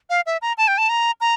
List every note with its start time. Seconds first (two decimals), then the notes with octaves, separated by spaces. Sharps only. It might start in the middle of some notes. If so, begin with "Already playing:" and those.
0.10 F5
0.26 E5
0.42 A#5
0.58 A5
0.68 G5
0.78 A5
0.89 A#5
1.21 A#5